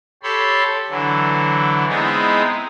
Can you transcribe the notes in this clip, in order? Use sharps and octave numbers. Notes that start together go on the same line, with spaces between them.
G4 A4 C#5 B5 C6
D3 E3 F#3
G#3 B3 C4 D#4 E4 G#4